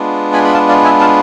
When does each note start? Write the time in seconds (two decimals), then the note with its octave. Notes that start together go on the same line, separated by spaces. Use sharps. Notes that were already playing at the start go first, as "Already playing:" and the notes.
Already playing: G#3 B3 D4 F4
0.33 G#5 B5
0.45 B5
0.53 F5 A5
0.69 D5 F5
0.84 E5 G#5
1.00 F5 A5